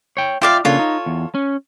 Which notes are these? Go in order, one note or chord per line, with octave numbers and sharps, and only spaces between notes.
C#5 G5
F4 C5 D5 E5 F5 G5
C#3 A#3 D4 F4 A4 C#5
D#4
E2
C#4